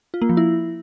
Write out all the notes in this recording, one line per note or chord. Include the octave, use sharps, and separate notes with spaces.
F4
A#3
F3
E4